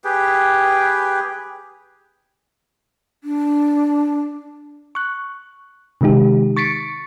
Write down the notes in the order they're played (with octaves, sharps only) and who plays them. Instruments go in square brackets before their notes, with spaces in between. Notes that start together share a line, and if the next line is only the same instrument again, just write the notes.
[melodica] G4 G#4 B4 G5
[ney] D4
[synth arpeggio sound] C#6 F#6
C3 D#3 G#3 D#4 G4
C#6 A6 B6 C#7 D7